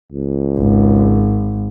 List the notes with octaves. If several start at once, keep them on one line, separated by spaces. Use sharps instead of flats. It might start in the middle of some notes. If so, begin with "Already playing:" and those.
C#2
G#1